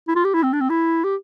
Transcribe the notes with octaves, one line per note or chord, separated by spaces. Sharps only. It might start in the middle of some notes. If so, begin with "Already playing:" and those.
E4
F4
G4
E4
C4
D4
C4
E4
G4